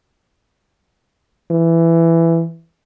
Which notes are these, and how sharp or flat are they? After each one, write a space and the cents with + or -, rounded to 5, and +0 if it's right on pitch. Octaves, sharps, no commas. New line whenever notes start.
E3 +10